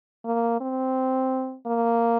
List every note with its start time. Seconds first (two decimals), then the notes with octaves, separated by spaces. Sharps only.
0.25 A#3
0.61 C4
1.67 A#3